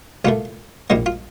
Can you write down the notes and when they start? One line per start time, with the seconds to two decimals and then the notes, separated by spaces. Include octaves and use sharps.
0.25 C2 A#2 A3 F4
0.90 A#1 A#2 G3 A#3 D#4
1.06 F4